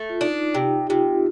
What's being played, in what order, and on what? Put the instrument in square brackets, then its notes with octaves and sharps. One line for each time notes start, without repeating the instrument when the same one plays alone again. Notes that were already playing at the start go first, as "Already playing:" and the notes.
Already playing: [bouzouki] A3
[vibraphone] F4
[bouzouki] D4 [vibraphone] D#4
[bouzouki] C3 [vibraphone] G4
[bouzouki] C3 [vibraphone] F4